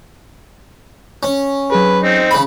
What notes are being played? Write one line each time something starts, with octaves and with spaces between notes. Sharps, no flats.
C#4
F#3 G#4 B4
C4 D#4
C#3 B5